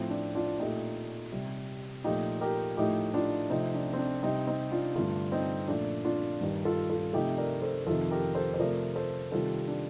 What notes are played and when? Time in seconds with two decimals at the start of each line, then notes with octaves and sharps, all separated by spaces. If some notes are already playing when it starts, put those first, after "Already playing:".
Already playing: A2 F3 A3 C4
0.10 D4
0.35 D4 F4
0.59 A#2 A3 D#4 G4
1.32 C3 G3
2.04 A#2 F3 A3 D#4 G4
2.41 G4 A#4
2.77 A2 F3 A3 D#4 G4
3.14 D4 F4
3.50 C3 F3 A3 C4 D#4
3.75 D4
3.93 C4
3.98 D4
4.23 C3 G3 C4 D#4
4.47 C4 D#4
4.72 D4 F4
4.96 G2 D3 A3 D4 F4
5.32 C4 D#4
5.68 A#2 F3 A3 D4
6.05 D4 F4
6.41 G2 D#3 G3
6.65 F4 A4
6.89 F4 A4
7.13 C3 F3 A3 D#4 G4
7.38 A#4 D5
7.62 A4 C5
7.87 F2 C3 D#3 F4 A4
8.11 G4 A#4
8.35 A4 C5
8.54 C5
8.59 C3 F3 A3 A#4 D5
8.96 A4 C5
9.32 C3 D#3 G3 F4 A4
9.68 D4